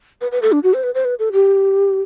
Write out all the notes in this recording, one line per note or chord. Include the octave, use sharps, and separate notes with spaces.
B4
B4
A4
D4
F#4
C5
B4
C5
B4
A4
G4